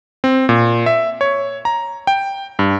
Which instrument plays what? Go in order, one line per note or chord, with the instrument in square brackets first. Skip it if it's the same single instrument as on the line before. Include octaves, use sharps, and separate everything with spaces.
[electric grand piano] C4
A#2
E5
C#5
A#5
G5
G2